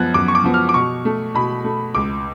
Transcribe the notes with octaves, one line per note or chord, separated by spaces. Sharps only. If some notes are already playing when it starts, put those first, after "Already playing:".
Already playing: F#2 F3 B3 F#6 G#6 A6
F#2 D6
C#6
D6
F3 B3
F6
D6
B2 C#6
A3
B2 B5
A3
C#2 D6